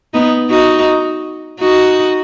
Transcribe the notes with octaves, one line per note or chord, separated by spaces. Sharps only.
B3 D#4
D#4 F#4
D#4 F#4